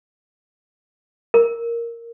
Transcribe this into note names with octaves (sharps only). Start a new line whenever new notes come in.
A#4